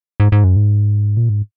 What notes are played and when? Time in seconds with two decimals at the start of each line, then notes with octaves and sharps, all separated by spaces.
0.20 G#2
0.32 G#2
0.44 F#2
0.56 G#2
1.17 A#2
1.29 G#2